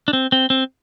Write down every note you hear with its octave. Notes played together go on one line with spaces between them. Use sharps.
D4
C4
C4
C4